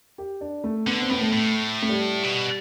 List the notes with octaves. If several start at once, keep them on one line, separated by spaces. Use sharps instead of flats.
G4
D4
A3
D3 B3
C4
A2 B3
A3
A2
A3
G3
B2